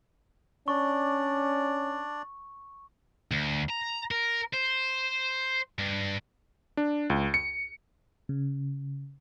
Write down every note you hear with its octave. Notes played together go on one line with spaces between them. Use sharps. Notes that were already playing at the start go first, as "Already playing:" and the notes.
C#4 D4 D5 C#6
D2
A#5
A#4
C5
G2
D4
C#2
C#7
C#3